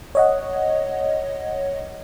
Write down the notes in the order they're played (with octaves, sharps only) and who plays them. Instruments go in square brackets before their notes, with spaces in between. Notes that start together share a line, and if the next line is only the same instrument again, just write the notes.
[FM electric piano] C#5 D#5 F#5